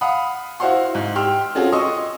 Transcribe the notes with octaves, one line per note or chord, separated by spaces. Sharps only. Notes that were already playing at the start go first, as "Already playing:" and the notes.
F5 F#5 B5 D#6
E4 F#4 C5 F5 F#5 C6
G#2
G4 G5 C6 E6 F6
C4 C#4 F4 F#4 G#4 A4
D#5 C6 C#6 D#6 E6